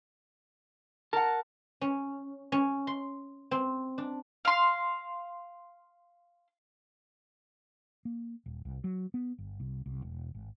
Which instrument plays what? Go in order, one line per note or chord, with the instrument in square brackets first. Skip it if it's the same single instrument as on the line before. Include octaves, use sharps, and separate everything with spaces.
[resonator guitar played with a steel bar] A#4 F#5 [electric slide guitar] A5
[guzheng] C#4
C#4
C6
C4
D4
[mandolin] F5 C6
[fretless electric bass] A#3
D#1
C2
F#3
B3
G1
C2
C2
E1
G#1